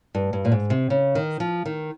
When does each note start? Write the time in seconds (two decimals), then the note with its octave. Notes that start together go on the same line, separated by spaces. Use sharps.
0.15 G2
0.33 G2
0.45 A#2
0.52 G#2
0.70 C3
0.90 C#3
1.15 D#3
1.40 F3
1.66 D#3